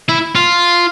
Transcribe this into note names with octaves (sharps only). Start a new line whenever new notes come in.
E4
F4